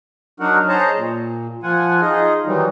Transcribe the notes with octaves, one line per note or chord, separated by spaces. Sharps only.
F#3 D4 D#4 F#4 A#4 F#5
G#4 C5 C#5 D#5 A5 A#5
A#2
F3 F4 F#5 G#5
D#4 F4 G#4 D#5
D#3 E3 F#3 G3 D#4